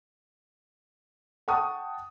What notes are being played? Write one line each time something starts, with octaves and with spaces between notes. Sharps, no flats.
F#5 G5 A5 C#6 D#6